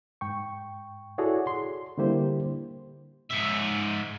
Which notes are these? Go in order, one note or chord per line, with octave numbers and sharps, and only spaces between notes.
G#2 G5 C#6
E4 F#4 G#4 A4 C#5 D5
C6
D3 G3 A#3 E4 G4 C5
G#2 E5